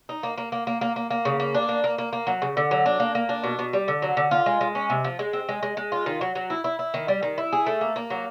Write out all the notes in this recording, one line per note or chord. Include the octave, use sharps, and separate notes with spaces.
D#4
A#3
A#3
A#3
A#3
A#3
A#3
A#3
C#3
A#3
D4
A#3
A#3
A#3
A#3
F#3
C#3
D3
F#3
D4
A#3
A#3
D4
B2
B2
G3
D3
F#3
D3
F4
G#3
G#3
C#4
C3
F3
G#3
C4
G#3
G#3
G#3
F4
D#3
F#3
F#3
E4
E4
E4
D#3
G3
D#3
E4
G#4
A3
A#3
A#3
F#3